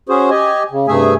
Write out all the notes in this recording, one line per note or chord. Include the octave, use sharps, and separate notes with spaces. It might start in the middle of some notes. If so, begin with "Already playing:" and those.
C#4 F#4 G#4 C5
G4 D#5 G#5
C#3
G2 C3 A3 G#4 E5 G#5